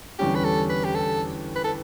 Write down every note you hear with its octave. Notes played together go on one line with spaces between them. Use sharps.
E2 D3 G3 C#4 G4
B4
A4
B4
G4
A4
B4
A4